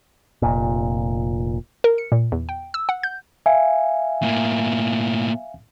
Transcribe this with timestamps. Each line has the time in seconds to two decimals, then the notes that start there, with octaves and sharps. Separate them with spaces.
0.42 F1 A#2
1.84 A#4
1.98 C#7
2.12 A#2
2.32 E2
2.49 G5
2.74 E6
2.89 F#5
3.03 G6
3.46 E5 F5 G#5
4.22 A2 A#3